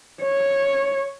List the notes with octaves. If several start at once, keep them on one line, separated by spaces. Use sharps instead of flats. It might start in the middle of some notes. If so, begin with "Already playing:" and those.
C#5